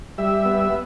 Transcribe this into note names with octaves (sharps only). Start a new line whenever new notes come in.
G3 E5
B3